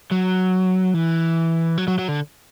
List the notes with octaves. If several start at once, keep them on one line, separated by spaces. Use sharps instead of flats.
F#3
E3
F#3
F#3
F#3
D3